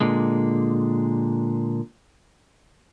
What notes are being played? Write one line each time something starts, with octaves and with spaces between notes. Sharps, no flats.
A#2 D3 G#3